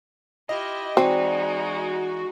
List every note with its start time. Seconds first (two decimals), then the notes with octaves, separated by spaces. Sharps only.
0.49 E4 F4 G4 D#5
0.97 E3 G#3 C4 D#4 F#4 D5